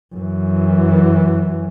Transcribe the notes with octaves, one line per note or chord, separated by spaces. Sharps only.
F#2 E3